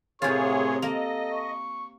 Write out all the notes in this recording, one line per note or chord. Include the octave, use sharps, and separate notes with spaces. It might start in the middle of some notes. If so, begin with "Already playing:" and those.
A2 C3 F4 G#4 A#4 C#5 C6
A#3 A4 D#5
C#6